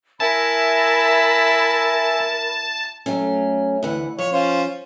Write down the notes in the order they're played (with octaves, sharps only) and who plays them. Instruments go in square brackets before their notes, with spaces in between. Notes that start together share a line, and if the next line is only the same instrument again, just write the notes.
[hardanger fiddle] E4 [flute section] A#4 B5 [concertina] E5 G#5 [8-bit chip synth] A5
[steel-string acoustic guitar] F#3 A3 C#4
D2 E3 F#5
[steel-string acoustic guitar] F3 [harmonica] C#5
[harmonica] C#4 F4 C5